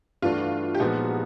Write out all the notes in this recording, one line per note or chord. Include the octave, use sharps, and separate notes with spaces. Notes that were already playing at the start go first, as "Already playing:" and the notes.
G2 E3 A3 D4 F4 F#4
G4
A#2 F3 G#3 B3 D#4 F#4